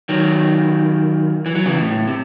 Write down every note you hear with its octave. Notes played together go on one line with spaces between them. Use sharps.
D#3 F#3
E3
F#3
C#3 E3
A2
C3